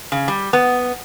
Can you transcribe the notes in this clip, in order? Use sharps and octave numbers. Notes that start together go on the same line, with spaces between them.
C#3
G3
B3